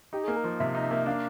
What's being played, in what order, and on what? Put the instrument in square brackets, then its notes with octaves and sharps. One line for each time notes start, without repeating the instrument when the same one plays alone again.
[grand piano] D#4 [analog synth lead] G4
[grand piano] A#3 [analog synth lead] G#4
[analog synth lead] A#4
[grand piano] F3
[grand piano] C3 [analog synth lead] E5
[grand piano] D#4
[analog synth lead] E5
[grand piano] A#3
[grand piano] D4 [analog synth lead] F5